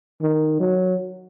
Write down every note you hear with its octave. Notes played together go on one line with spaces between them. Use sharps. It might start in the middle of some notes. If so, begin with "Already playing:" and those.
D#3
F#3